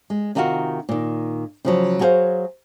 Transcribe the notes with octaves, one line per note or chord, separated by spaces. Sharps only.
G#3
C3 D#3 D#4 F4 F#4 A#4
A#2 D#3
C#3 F3 F#3
F#3 F#4 G#4 A4 C5 F5